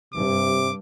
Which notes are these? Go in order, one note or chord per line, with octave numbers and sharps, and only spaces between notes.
G2 C3 D6